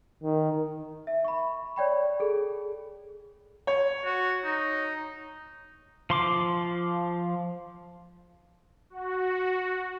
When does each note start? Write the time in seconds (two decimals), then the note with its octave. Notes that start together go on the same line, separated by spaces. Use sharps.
0.23 D#3
1.07 E5
1.24 B5 C#6
1.76 C#5 D5 G5 B5
2.20 G#4 A4
3.67 C#5
4.05 F#4
4.44 D#4
6.10 F3 C6 D6
8.90 F#4